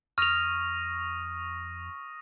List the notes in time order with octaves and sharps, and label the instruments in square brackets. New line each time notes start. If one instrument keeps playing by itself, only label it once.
[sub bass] F2 [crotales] C#6 D#6 A#6 [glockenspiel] F6 F7